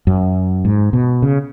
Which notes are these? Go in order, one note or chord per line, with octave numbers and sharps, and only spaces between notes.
F#2
G#2
B2
C#3